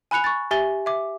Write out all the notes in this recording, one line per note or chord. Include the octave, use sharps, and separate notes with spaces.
G#5 B5 F#6 C#7 F7
C#6 A6
G4 E5 G#5 A6 G7
E5 D6